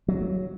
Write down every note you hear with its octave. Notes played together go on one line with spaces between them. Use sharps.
F#3